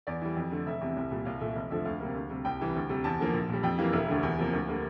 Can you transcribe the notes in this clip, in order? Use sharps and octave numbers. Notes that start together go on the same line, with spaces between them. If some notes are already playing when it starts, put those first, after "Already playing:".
E2 D5
E3 G3
F2
D3 A3
F1 E5
E2 C3
C2
A#2 G3
C2 F5
A#2 A3 E5
F1
F2 D3 F3 A3 E5
D2 F5
C3 G3 A#3
D2
C3 G3
C2 G5
C3 E3 G3
D2
C3 G3
E2 A5
D3 F3 A#3
A#1
A#2 G3
F2 G5
E3 G3 A#3 F5
E1 E5
D2 D3 G3
E2
C3 F3 A#3
D2
D3 G3 A#3